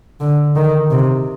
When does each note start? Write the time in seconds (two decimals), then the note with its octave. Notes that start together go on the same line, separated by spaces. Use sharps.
0.21 D3
0.56 D#3
0.91 C3